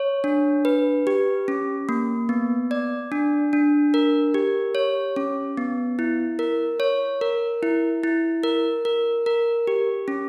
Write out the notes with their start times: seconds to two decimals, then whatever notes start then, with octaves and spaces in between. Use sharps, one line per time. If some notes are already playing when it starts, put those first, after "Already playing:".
Already playing: C#5
0.24 D4
0.65 B4
1.07 G4
1.48 C#4
1.89 A#3
2.29 B3
2.71 D5
3.12 D4
3.53 D4
3.94 A#4
4.34 G4
4.75 C#5
5.16 C#4
5.57 B3
5.99 E4
6.39 A#4
6.80 C#5
7.21 A#4
7.63 E4
8.03 E4
8.44 A#4
8.85 A#4
9.26 A#4
9.67 G4
10.08 C#4